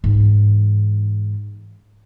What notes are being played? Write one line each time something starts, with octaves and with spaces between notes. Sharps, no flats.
G#2 E3